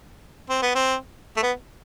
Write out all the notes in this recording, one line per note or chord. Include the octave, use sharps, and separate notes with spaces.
C4
B3
C4
A3
B3